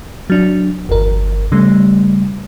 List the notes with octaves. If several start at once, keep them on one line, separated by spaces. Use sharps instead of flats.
F#3 D4
G1 E2 A#4
C#3 G3 A3